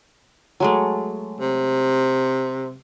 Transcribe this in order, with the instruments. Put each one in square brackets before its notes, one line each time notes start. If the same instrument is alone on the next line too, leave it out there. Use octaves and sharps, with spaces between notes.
[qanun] F#3 G#3 A3
[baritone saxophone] C3